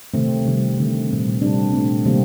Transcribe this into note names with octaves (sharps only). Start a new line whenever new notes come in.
C3 D#3 A3 C4
C3 D#3 G3
D3 A3 C4
A#2 G3 C4
C3 G3 C4 D4
A#2 A3 C4
C3 D#3 G3 A#3 C4